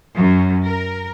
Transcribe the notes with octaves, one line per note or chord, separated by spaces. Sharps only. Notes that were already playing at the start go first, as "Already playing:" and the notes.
F#2
A#4